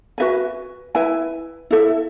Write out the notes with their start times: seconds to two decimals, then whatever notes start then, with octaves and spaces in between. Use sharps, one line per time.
0.18 F#4 B4 E5 G#5
0.95 E4 B4 E5 G#5
1.71 E4 A4 E5